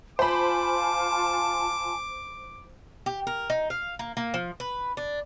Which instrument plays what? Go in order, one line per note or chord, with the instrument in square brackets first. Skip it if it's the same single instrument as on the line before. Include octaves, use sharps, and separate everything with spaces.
[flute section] F4 G#5 A5 [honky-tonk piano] C5 B5 [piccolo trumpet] D6
[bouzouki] G4
A#4
D#4
F5
A#3
A#3
F3
B4
D4